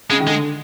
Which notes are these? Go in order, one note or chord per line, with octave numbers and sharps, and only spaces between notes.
C#3 G#3
D#3
D3 G#3